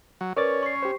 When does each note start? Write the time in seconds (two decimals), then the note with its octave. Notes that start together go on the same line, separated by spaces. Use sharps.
0.21 F#3
0.37 C#4 A#4 B4 C#5 D5 A6
0.63 C#6 C7
0.83 G4 C5